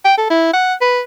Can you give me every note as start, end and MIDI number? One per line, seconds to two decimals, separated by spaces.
0.05 0.14 79
0.18 0.27 69
0.30 0.50 64
0.53 0.74 78
0.81 1.01 71